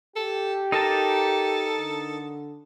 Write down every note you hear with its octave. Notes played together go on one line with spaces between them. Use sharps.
G4 A4
D#4 A4 A#4 A5
D3